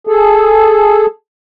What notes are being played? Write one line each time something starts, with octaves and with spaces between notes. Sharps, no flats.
G#4 A4